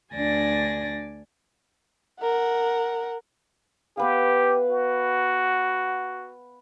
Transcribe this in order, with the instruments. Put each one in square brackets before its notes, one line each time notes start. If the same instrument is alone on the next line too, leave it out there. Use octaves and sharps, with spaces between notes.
[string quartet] D2 D4 D5 G#5 A6 A#6
[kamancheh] A#4 F#5
[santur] B3 B4 F5 [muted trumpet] G4
[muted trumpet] F#4